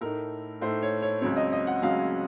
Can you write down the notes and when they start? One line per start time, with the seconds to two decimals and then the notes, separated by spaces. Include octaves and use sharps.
0.01 A2 A3 D#4 A#4
0.61 A2 A3 D#4 C5
0.82 C#5
1.02 C#5
1.21 C#2 C#3 F#3 C4 C#5
1.37 D#5
1.53 D#5
1.67 F#5
1.82 C#2 C#3 F#3 C4 F5